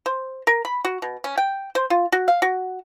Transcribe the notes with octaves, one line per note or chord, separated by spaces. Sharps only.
C5
A#4
B5
F#4
B2
C#4
G5
C5
F4
F#4
F5
F#4